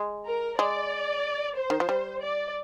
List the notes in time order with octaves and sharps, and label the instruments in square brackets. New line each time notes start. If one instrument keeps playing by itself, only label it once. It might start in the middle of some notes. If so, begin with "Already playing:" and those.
Already playing: [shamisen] G#3
[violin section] A#4
[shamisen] G#3 [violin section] D5
[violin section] C5
[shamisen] D#3
F3
G3
[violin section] D5